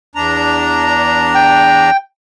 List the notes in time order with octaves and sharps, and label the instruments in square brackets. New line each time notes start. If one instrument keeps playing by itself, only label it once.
[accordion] E2 D4 A#5
[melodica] G5